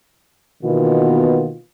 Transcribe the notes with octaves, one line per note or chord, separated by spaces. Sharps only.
B2 D#3 E3 A#3 B3 F4